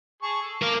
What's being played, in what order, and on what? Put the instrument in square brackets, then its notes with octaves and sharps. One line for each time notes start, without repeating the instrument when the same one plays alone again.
[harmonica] G#4 A5 C#6
A4
[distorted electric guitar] A#4 F5 [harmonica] A5 D6